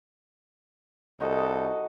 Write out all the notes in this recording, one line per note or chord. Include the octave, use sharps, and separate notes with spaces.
C2 D#4 F#4 A4 D#5